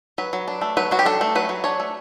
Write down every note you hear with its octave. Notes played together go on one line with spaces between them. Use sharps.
F#3 B4
F#3
D4
A3
F#3 B4
F#3 F#4
G4
D4 A4
A3
F#3 B4
F#3
D4 C#5
A3